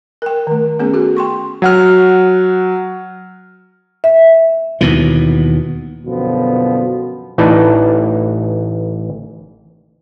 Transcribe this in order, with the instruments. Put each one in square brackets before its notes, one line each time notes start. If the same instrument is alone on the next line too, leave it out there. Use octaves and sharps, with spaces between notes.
[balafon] A#4 G5
D#3 A3
A3 B3 C#4 G#4
F#4 G#4 A4
G5 C6 C#6
[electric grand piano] F#3 F#5 F6
[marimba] E5
[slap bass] D#2 B2 E3
[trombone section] C2 F#2 B2 D3 F3 B3
[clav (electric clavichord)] A1 E3 D#4 B4 D5 A5